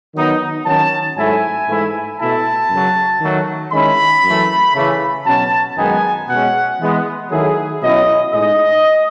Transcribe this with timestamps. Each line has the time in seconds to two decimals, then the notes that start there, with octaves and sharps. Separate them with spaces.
0.14 D#3 F#3 B3 D#4
0.65 D#3 F#3 C#4 A5
1.16 G#2 F#3 A3 E4 G#5
1.68 G#2 E3 A3 E4
2.19 B2 A3 E4 A5
2.70 F#2 C#3 F#3
3.21 D#3 F#3 A3
3.72 D#3 G#3 C#4 E4 B5
4.23 F#2 E3 A3
4.75 C#3 E3 A3
5.25 B2 F#3 C#4 A5
5.76 F#2 D#3 G#3 B3 D#4 G#5
6.28 B2 G#3 C#4 F#5
6.79 E3 G#3 B3
7.30 D#3 F#3 A3 E4 G#4
7.81 B2 F#3 C#4 E4 D#5
8.32 A2 G#3 D#4 D#5